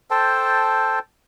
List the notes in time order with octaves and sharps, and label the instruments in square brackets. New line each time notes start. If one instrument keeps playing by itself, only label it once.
[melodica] A4 C5 G5 A5